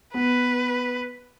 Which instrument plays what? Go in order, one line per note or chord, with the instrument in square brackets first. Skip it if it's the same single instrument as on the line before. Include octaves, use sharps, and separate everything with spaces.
[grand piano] B3 [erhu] B4